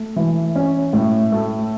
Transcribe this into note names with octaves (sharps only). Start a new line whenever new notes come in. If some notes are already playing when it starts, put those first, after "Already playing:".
Already playing: A3
E3
C#4
A2
A3